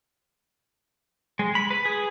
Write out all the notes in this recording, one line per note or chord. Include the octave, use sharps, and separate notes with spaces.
G#3
B5
B4
G#4